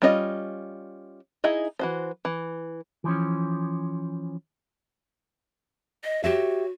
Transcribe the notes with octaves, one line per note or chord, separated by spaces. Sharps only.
G3 C#4 D4 F4 D#5
D#4 E4 G#4 D#5
E3 F#4 C5
E3
E3 F3 C#4
D#5
F#4 G4 C#5 E5